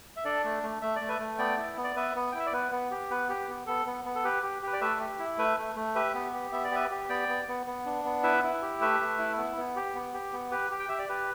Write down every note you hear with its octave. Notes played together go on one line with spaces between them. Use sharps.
E5
D4 A4 D5
A3
A3
A3 E5
A3 D5
B4 E5
A3
B3 D5 G5
E4
B3
D5
B3 B4 E5
B3
E4 G5
E5
D5
B3 B4
B3
G4
B3 B4
G4
B3
B3 A4
B3
B3
A4
G4 B4
G4
G4 B4
D5
A3 B4 E5
G4
E4
A3 B4 E5
A3
A3
G4 B4 E5
B3
G4
B3 E5
D5
G4 B4 E5
G4
B3 D5 G5
B3
B3
B3
D4
B3
E4 B4 E5
E4
G4
A3 B4 E5
A3
E4
B3
B3
G4
B3
G4
B3
G4 B4
G4
G5
G4 E5
D5
G4 B4